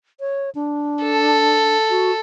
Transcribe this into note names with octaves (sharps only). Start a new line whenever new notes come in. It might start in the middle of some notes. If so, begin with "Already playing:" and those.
C#5
D4
A4
F#4